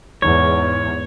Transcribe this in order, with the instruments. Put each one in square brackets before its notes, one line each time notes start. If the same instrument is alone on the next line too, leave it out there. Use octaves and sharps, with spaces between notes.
[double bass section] E2 G#2 [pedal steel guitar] C#5